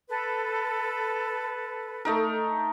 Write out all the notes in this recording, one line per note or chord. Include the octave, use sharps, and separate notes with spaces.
A4 B4
A3 D#4 A#4